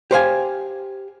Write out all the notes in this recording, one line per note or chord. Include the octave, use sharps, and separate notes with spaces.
G4 C5 F5 G#5